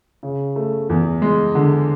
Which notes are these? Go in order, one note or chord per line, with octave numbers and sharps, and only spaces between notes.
C#3
A3
E2
G#3
D3